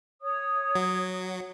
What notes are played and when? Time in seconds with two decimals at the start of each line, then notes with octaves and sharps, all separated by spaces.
0.21 C#5 D#6
0.75 F#3